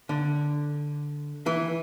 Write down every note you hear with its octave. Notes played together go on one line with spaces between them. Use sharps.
D3
E3